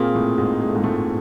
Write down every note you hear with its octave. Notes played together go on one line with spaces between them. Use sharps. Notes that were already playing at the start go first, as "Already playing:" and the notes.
Already playing: A#2 A#3 C4 F4 G#4
A2 A3
G#2 G#3
G#3
A3
G#2 G#3
A2 A3